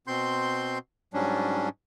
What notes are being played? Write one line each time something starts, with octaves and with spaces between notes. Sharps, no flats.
B2 C4 C6 G6
G#2 F#3 G3 C#4 D4